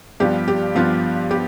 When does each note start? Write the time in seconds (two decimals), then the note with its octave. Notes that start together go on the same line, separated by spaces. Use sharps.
0.20 G2 F3 B3 G4
0.48 G4
0.75 G2 F3 B3 F4
1.31 B3 G4